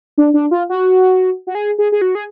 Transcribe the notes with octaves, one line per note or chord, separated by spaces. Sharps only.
D4
D4
F4
F#4
F#4
G#4
G#4
G#4
F#4
G#4